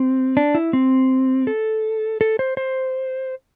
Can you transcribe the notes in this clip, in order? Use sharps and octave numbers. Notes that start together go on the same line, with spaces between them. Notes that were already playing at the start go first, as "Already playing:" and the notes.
Already playing: C4
D4
E4
C4
A4
A4
C5
C5